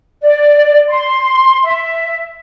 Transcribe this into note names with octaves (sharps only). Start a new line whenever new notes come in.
D5
C6
E5